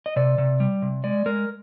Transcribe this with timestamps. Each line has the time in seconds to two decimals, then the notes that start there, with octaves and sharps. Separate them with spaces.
0.06 D#5
0.16 C3 D5
0.38 C3
0.60 G3
0.82 C3
1.04 G#3 D5
1.26 G#3 A#4